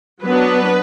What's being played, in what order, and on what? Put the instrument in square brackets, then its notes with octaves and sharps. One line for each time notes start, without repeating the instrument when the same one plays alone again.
[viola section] F#3 B3 D4 B4